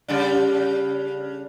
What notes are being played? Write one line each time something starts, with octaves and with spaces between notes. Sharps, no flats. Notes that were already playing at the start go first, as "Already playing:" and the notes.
C#3 G3 D4